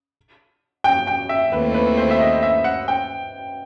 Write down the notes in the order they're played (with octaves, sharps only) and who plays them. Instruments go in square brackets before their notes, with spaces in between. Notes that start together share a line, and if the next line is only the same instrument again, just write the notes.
[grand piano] G5
G5
E5
[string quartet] D#2 D#3 A3 C4 E4 [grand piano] B4
[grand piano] B4
C5
E5
D#5
E5
F#5
G5